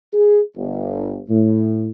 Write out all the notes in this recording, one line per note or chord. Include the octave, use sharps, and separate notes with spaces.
G#4
G1
A2